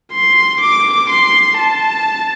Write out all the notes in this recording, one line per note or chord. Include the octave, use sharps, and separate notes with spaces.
C6
D6
C6
A5